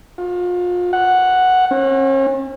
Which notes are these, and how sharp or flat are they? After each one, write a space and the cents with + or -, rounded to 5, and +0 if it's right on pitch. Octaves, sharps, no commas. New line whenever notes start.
F4 +35
F#5 +0
C#4 -40